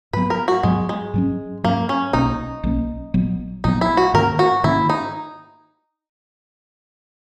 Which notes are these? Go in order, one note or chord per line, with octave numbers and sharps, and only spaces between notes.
G#2 F#3 B3 B4
A#4
F#4
G#2 F#3 G#3 B3
G#3
G#2 F#3 C#4
G#2 F#3 A#3 C#4
C#4
B1 B2 A#3 C#4 D#4
B1 B2 A#3 C#4
A#1 A#2 F#3 B3
A#1 A#2 F#3 B3 D#4
E4
F#4
G#2 D#3 A#3 C#4 A#4
F#4
G#2 D#3 A#3 C#4 E4
D#4